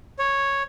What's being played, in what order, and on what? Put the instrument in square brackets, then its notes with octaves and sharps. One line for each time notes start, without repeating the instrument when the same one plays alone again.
[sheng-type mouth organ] C#5